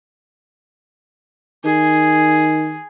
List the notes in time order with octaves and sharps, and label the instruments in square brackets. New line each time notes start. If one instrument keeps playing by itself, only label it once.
[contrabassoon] D#3 [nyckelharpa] G#4